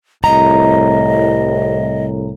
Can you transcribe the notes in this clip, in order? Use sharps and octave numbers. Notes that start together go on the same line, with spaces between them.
C2 A2 D#5 A#5